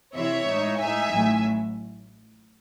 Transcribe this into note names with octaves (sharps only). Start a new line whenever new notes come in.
C3 E3 C4 E4 C#5 E5
A2 G#3 D#4
A2 G#3 D#4 E5 G#5
A1 A2 F#3